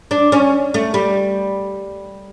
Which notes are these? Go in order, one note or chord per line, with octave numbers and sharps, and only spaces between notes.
D4
C#4
A3
G3